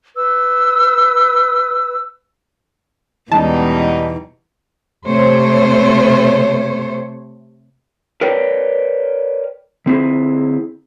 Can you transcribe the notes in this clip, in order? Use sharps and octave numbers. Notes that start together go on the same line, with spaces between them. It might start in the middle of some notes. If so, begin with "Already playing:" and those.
B4 E6
E2 B2 E3 G3 G#3 C#4 D#4 A5
C3 A3 C5 C#5
A#4 B4 C#5 D5 G5
D3 C4 E4 G#4